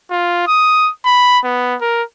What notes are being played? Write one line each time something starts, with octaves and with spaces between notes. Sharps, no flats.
F4
D#6
B5
B3
A#4